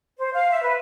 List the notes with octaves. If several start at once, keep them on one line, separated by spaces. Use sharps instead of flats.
C5
F5
E5
B4